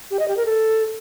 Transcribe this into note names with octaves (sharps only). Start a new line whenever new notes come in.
G4
D#5
G4
A#4
A4